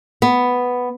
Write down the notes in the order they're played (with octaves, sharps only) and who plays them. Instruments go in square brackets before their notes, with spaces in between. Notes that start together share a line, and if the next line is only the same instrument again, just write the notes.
[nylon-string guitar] B3